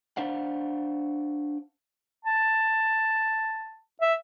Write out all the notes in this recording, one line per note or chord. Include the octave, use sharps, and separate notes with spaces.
D4 C5 F5 F#5
A5
E5